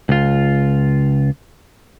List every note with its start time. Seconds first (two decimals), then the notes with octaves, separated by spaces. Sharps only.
0.09 C#2 F4